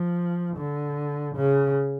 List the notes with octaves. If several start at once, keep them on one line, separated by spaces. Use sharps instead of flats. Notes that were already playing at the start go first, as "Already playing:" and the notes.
Already playing: F3
D3
C#3